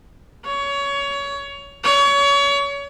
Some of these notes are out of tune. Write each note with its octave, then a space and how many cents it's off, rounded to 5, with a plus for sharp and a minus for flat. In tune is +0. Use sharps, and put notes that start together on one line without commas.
C#5 +20
C#5 +30